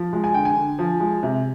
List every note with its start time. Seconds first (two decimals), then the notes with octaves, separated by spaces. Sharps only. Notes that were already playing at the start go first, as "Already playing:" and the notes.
Already playing: F3
0.13 G#3
0.24 G#5
0.34 D3 G5
0.45 G#5
0.56 D3
0.79 F3
1.00 G#3
1.23 C3